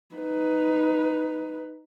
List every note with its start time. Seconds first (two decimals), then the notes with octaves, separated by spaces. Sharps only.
0.15 D#4 B4